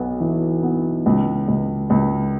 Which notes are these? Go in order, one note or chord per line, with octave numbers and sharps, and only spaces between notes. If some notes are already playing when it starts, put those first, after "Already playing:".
Already playing: B1 B3
E3
B3
C#2
C#2
C#2